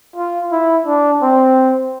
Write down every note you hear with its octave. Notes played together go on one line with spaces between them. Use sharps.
F4
E4
D4
C4